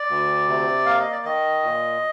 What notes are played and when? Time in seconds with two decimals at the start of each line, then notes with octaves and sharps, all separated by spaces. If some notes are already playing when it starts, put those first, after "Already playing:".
Already playing: D5
0.09 D2
0.47 C3
0.86 A#3 F5
0.99 D#5
1.12 D5
1.25 D#3 D#5
1.63 A#2